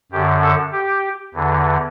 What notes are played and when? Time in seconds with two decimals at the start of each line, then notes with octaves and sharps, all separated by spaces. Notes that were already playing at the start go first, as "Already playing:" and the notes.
0.12 F#2 D3 G4
0.42 A4
0.73 G4
1.34 E2 D3